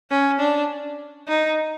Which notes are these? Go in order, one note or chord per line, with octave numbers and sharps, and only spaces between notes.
C#4
D4
D#4